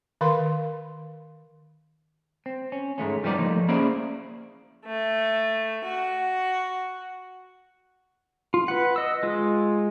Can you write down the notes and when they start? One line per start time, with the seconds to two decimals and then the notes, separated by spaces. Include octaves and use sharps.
0.21 D#3 A#4 F5 C6
2.46 C4
2.72 C#4
2.98 G#2 G#3 A3 C#4
3.23 G2 F3 G3 B3 D#4 D5
3.37 F3 A3 A#3 D#4
3.68 A#3 C#4 E4 G#4 C5 D5
4.85 A3
5.84 F#4
8.54 F4
8.68 B4 F#5
8.96 D#5 E6
9.23 G#3 F4